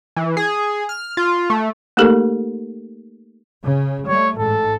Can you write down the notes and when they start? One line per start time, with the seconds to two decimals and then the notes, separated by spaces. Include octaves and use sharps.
0.16 E3
0.37 G#4
0.89 F6
1.17 F4
1.50 A3
1.97 A3 A#3 D#4 G4 A4 A#4
3.63 C#3
4.08 G3 A3 C#5
4.38 A1 G#2 A4